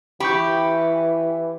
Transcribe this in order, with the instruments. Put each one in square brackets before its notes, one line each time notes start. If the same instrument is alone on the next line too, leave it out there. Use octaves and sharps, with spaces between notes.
[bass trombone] E3 [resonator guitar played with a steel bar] G4 [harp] B5 C#6 G6